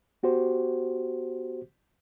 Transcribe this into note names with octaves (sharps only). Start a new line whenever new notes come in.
B3 F#4 G4 C5